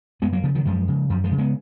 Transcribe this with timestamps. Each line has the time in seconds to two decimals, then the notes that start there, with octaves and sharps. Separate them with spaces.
0.22 F#2 G#3 B3
0.32 F#3 A#3
0.43 C#3 F3
0.55 D#3 F#3
0.65 F#2 F3 G#3
0.88 C#3
1.10 F#2 F3
1.24 F3 G#3
1.31 C#3
1.38 G#3 B3